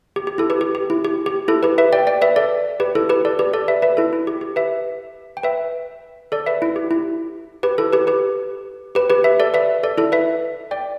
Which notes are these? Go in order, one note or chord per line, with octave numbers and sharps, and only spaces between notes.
G4
G4
E4 A4
G4 B4
G4
G4
E4
G4
G4
E4 A4
G4 B4
B4 E5
D5 G5
D5 G5
B4 E5
A4 D5
G4 B4
E4 A4
G4 B4
A4 D5
G4 B4
A4 D5
B4 E5
B4 E5
E4 A4
E4
G4
G4
B4 E5
G5
B4 E5
A4 D5
B4 E5
E4
G4
E4
G4 B4
E4 A4
G4 B4
G4 B4
G4 B4
G4 B4
B4 E5
A4 D5
B4 E5
A4 D5
E4 A4
B4 E5
D5 G5